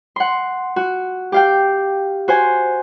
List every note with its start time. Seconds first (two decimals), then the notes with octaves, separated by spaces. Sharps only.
0.16 F#5 C6
0.76 F#4
1.32 G4 F5 G5
2.28 F#4 C5 G#5